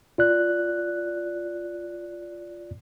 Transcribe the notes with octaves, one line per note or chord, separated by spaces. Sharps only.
F4 D5 F#6